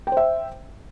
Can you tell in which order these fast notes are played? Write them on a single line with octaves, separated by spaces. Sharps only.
G5 C5 E5